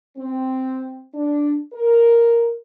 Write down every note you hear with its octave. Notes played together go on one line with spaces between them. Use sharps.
C4
D4
A#4